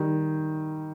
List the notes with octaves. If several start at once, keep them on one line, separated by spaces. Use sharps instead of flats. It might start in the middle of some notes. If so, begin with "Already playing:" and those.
Already playing: D#3 G3